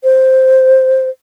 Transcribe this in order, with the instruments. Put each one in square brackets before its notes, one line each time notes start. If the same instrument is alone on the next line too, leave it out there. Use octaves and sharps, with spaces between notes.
[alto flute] C5